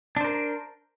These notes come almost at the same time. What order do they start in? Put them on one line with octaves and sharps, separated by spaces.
D4 C5 A#4